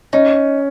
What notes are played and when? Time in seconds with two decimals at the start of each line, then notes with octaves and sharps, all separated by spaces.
0.13 C#4 D#4